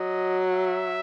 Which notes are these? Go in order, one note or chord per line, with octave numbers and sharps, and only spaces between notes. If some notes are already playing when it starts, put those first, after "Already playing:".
Already playing: F#3 D#5
E5